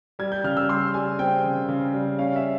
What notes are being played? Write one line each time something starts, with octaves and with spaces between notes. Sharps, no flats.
G3 G#6
G6
C#3 F6
E6
G3 C6
G3 G#5
C4 G5
C#3
C#3
G3
C#4 F5
E5